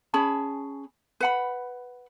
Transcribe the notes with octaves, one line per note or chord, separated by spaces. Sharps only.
C#4 G#4 A5 B5
B4 F#5 B5